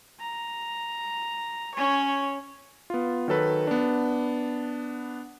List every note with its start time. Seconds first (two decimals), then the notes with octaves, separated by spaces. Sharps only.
0.20 A#5
1.75 C#4 C#5
2.90 B3 F4
3.28 D#3 F#3 A4 B4
3.67 B3 D4